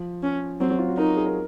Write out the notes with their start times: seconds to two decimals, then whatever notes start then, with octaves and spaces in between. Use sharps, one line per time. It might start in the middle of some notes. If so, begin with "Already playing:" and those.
Already playing: F3
0.23 C#4
0.60 F#3 C4
0.70 F#3
0.79 F4
0.89 F#4
0.97 D#4 A#4
1.17 G#4
1.26 A#4